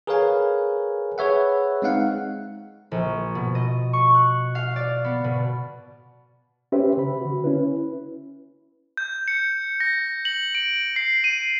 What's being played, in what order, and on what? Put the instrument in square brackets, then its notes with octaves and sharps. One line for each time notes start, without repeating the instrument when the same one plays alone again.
[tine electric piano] G#4 A#4 B4 C#5 F5 G#5
G#4 B4 C#5 E5 F#5
G#3 C4 D#4 F5 F#5
[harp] A#1
B2
D#5
C#6
F#6
F5
D5
B3
B2
[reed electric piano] C#4 G4 B4 C5 E5
C#3 B5
D3 F#4
C#4 E4 B4
[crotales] G6
C#7
A#6
F#7
D7
C7
D#7